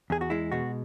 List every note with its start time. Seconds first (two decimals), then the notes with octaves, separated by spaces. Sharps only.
0.10 E2 G#4
0.21 F#4
0.30 G#3 E4
0.52 B2 F#4